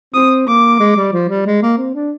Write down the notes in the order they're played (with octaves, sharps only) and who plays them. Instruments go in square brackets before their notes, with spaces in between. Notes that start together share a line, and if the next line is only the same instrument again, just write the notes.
[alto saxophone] C4 [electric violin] D#6
[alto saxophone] A#3 [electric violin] D6
[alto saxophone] G#3
G3
F3
G3
G#3
A#3
C4
D4